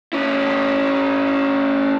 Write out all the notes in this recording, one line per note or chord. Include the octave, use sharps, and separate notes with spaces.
C#4 E4